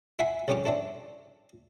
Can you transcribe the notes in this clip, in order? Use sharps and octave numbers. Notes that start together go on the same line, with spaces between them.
E4 E5 F#5 G#5 B5 C6
C2 F2 C#3 C#4 G4 D6
C4 D4 E4 A4